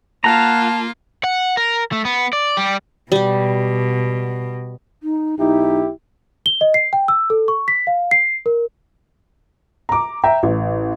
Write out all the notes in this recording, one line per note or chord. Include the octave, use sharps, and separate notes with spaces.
A#3 F4 F5 F#5 A5 A#5
F#5
A#4
A3
B3
D5
G3 G4
B2 G3 G4
D#4
B1 D#4 E4 G4
G7
D#5
C7
G5
E6
A4
C#6
B6
F5
C7
A#4
A#5 D6
E5 G5 A#5
A1